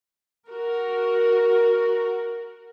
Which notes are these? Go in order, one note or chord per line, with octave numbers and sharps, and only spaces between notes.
F#4 A#4